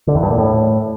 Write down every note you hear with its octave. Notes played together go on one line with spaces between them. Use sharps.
D3
E2
G2
A#2
A2